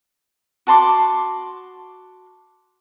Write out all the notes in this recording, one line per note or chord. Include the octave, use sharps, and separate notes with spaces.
F#4 A5 C6 D6